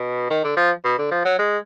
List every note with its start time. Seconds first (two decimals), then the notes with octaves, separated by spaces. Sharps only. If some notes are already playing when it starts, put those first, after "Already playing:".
Already playing: B2
0.30 D#3
0.44 D3
0.57 F3
0.85 B2
0.98 D3
1.11 F3
1.25 F#3
1.39 G#3